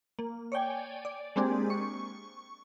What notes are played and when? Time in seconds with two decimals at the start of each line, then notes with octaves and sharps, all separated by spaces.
0.19 A#3
0.52 C#5 D5 G5 G#5
1.05 D5
1.36 G#3 A#3 C4 D4 G4 G#4
1.70 C#6